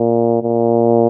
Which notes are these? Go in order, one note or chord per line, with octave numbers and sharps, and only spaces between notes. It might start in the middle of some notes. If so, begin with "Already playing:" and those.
Already playing: A#2
A#2